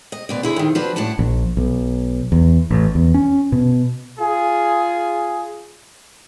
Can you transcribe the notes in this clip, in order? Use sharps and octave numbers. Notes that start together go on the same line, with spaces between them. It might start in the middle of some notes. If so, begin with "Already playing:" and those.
D#5
D2 B2 D5
D3 E4 G#4
F2 D#3
F3 D4 F#4 B4
A2 D4 F#5 A5
A#1
B1
E2
A1
E2
C#4
B2
F4 G#4